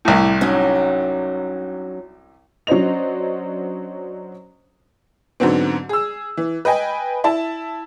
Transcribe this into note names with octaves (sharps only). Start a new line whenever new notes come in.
C2 A2
F#3 C#4 D#4
F#3 C#4 D4 C5 D#5 F7
G#2 D3 F#3 B3 C4
G#4 E6
E3
B4 D#5 G5 G#5
E4 A5